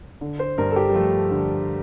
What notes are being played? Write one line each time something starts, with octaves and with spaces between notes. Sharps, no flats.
D3
C5
G2 A#4
A4
G4
G3
F3 A3
D3